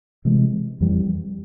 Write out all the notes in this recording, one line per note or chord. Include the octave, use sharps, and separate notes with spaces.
C3 E3 G#3
F2 E3 G3